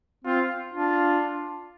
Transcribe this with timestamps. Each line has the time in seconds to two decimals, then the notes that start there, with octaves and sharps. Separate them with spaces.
0.25 C4 F4
0.74 D4 F4